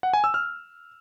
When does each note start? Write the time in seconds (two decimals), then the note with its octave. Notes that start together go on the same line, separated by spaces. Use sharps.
0.03 F#5
0.13 G#5
0.24 E6
0.34 F6